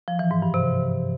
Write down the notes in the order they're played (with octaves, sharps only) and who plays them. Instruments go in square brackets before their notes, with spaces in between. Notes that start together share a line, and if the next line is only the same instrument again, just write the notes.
[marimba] F3
E3
G#2
G2
C3